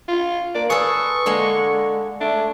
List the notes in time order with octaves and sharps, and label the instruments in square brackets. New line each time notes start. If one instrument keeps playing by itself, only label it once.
[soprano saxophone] F4
[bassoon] A#3 [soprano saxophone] D5
[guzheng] G#4 A4 [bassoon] B4 [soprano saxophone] C#6
[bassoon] D3 [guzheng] G#3 A#3 G#5
[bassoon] A3 [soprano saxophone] D4